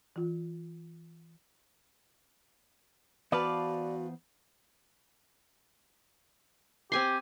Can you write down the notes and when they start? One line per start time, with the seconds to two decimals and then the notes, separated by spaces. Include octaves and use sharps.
0.16 E3 F4
3.32 E3 B3 F#4 B4 C5 D5 F5 A5
6.92 C4 G4 G#5 C6